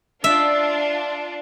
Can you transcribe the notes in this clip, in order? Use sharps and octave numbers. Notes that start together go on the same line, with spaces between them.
D4 F4 E5